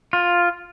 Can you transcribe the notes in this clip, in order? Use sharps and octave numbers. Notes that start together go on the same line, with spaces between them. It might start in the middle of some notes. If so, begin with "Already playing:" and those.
F4